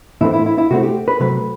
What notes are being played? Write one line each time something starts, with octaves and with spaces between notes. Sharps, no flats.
A2 E3 A3 C4 E4
E4
E4
E4
C3 F#3 A3 C4 F#4
G4
B4
C3 F#3 A3 C4 B4